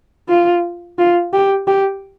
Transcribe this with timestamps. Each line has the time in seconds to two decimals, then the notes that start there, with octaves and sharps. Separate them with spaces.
0.29 F4
0.98 F4
1.33 G4
1.67 G4